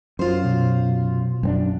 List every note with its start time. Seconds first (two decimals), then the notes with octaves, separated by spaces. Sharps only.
0.19 F#2 F4 C5
0.45 B2
1.43 F#2 C4 D4